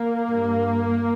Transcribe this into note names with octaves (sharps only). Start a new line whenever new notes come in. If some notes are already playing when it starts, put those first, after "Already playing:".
Already playing: A#3
G2